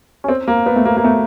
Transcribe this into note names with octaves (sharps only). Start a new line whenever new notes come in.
C#4
C4
A#3
B3
A3
A#3
A#3
A3